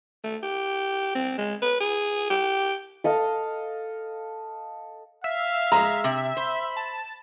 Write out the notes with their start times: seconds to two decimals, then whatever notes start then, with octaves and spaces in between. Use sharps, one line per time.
0.24 A3
0.43 G4
1.15 C4
1.38 G#3
1.62 B4
1.81 G#4
2.30 G4
3.04 A4 D#5 F5
5.24 E5 F5
5.72 G#3 A#5
6.04 C3
6.37 C5 B5
6.77 A5